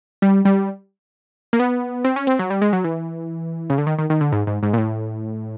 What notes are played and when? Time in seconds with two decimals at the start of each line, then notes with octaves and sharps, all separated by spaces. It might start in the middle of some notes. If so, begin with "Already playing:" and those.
0.22 G3
0.45 G3
1.53 A#3
1.60 B3
2.05 C4
2.16 C#4
2.27 C4
2.39 F#3
2.50 G3
2.62 G#3
2.73 F#3
2.84 E3
3.70 C#3
3.78 D3
3.87 D#3
3.99 D#3
4.10 D#3
4.21 D3
4.32 G#2
4.47 G#2
4.63 G#2
4.73 A#2
4.78 A2